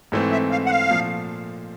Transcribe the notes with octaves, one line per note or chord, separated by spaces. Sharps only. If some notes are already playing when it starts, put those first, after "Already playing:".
G#2 E3 A3 C4
E5
F5
F#5
F5
A#2 F3 A3